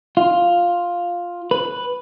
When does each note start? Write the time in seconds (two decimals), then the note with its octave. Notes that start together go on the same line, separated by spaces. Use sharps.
0.17 F4
1.51 B4